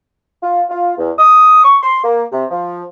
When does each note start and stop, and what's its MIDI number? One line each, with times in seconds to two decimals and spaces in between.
0.42 0.62 65
0.69 0.92 65
0.97 1.10 40
1.18 1.63 87
1.63 1.76 85
1.81 2.01 84
2.03 2.24 58
2.32 2.45 48
2.50 2.82 53